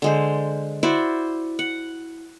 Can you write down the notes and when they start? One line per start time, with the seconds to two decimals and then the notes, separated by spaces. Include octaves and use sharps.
0.02 D3 G#3 C5
0.83 E4 F#4 C5 D5
1.59 F#5